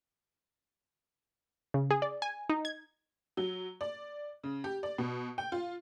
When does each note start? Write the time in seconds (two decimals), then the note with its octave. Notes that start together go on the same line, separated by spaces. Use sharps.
1.74 C#3
1.91 G#4
2.02 D5
2.22 G#5
2.50 D#4
2.65 G#6
3.37 F#3
3.81 D5
4.44 C#3
4.64 G4
4.83 D5
4.98 B2
5.38 G5
5.52 F4